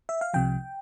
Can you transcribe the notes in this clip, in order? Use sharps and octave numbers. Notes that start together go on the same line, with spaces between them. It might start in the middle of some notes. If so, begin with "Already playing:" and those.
E5
F5
C2 C3 F3 G5